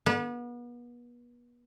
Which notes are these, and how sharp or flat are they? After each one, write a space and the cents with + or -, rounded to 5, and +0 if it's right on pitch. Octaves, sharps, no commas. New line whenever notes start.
B3 -35